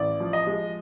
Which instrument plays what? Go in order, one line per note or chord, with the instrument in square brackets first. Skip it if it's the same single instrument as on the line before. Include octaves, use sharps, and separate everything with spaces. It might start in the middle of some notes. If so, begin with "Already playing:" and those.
Already playing: [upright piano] A1 D5
F3
D#5
G#3